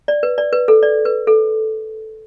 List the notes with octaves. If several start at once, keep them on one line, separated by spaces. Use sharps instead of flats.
D5
B4
D5
B4
A4
D5
B4
A4